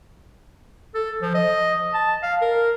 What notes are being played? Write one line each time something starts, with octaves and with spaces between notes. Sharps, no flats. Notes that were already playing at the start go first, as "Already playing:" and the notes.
A4
F3
D#5
A5
F5
A#4